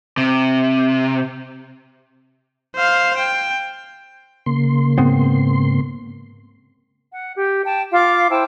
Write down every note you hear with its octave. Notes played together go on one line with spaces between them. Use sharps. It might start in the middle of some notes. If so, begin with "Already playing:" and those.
C3
C5 F5
G5
C#3 A#3 C6
G#2 B3 C4
F#5
G4
G5 A5
F4 F5 D6
E4 C5 G5 A5